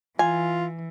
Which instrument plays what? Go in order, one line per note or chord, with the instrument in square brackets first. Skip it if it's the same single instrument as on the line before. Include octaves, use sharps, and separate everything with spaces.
[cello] E3 [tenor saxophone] F4 [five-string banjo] G#5